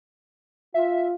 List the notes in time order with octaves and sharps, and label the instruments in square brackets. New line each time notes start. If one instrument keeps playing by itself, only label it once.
[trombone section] F4 [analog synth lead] E5